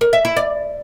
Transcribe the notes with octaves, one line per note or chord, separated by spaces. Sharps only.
A#4
E5
E4
D5